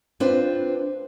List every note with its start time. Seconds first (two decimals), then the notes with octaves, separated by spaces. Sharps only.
0.20 C4 D4 F4 B4 C5